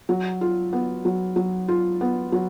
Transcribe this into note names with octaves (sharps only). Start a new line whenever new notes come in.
F#3
F4
B3
F#3
F#3
F4
B3
F#3